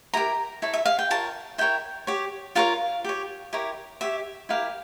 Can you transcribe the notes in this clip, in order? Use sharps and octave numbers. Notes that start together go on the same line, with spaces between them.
E4 G4 A#4 A#5
E4 A4 C#5
E5
F5
G5
F4 A#4 C#5 A5
E4 A#4 C#5 G5
G4 C#5
F4 A#4 C#5 F5
G4 C#5
E4 G4 A#4 C#5
G4 C#5 E5
E4 G4 A#4 F5